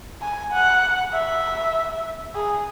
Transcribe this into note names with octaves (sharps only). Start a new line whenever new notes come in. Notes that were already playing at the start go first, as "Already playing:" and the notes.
G#5
F#5
E5
G#4